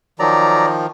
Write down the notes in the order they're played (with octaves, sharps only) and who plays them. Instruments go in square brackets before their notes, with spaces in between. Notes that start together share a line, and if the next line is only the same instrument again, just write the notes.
[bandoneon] D#3 F3 [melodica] F#3 D5 A#5